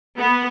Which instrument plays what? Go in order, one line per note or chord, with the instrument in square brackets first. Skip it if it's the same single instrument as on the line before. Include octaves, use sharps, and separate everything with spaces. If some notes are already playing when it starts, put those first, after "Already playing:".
[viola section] B3